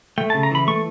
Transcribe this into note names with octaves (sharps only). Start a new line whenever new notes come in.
A3 G5
A5
C#3
A#5
E3 B5
A3 C#6